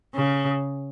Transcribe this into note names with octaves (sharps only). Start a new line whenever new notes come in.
C#3